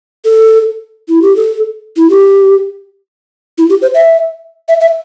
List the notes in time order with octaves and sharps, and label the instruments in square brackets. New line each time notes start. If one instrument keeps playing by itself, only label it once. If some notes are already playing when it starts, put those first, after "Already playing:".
[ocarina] A4
E4
G4
A4
E4
G4
E4
G4
C5
E5
E5
E5